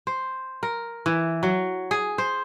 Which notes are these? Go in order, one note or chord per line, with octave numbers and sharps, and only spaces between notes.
C5
A#4
E3
F#3
G#4
C5